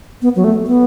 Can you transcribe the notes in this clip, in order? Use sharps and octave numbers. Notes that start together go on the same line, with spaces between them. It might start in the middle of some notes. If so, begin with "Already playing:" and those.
B3
F#3
A3
B3